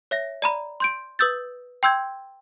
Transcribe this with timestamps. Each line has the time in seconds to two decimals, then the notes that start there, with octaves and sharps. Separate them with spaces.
0.11 C#5 E5 A#6
0.42 D5 A#5 B5
0.80 C6 G6 D7
1.19 B4 D#6 E6 G6 A6
1.83 G5 C6 E6 G6 G#6